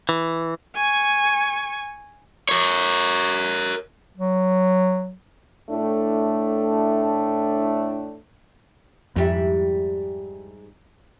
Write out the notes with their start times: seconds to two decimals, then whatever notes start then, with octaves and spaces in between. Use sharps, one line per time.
0.09 E3
0.76 G#5 C#6
2.49 A#4 C#5
4.17 F#3
5.70 A2 A3 D4
9.16 F2 G#2 G3 E4